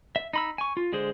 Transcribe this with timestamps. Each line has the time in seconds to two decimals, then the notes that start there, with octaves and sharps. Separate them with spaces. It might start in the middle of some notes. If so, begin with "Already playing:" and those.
0.16 E5
0.33 D#4 B5 E6
0.58 G#5 C#6
0.77 F4
0.93 D3 G#3 G#4 C5